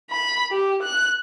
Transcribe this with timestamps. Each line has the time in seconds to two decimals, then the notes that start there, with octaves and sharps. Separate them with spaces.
0.11 B5
0.52 G4
0.82 F#6